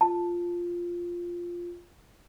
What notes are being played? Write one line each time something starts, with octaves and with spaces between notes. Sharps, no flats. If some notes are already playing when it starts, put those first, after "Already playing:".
F4 A5